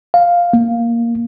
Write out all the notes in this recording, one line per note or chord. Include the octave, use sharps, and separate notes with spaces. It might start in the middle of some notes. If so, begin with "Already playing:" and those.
F5
A#3